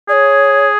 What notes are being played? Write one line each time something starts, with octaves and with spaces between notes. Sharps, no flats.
G#4 C#5 D5